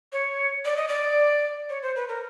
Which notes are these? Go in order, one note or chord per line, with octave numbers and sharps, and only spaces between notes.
C#5
D5
D#5
D5
C#5
C5
B4
A#4